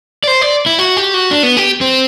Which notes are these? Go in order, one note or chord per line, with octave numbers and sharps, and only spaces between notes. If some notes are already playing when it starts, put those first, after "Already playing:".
D5
C5
D5
E4
F#4
G4
F#4
D4
B3
G4
C4